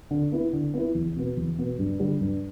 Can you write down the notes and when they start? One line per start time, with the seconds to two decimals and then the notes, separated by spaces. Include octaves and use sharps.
0.11 D3
0.32 B3 E4
0.53 D3
0.74 B3 E4
0.95 E2
1.16 B2 B3
1.37 E2
1.58 B2 B3
1.79 G2
2.00 D3 G3
2.21 G2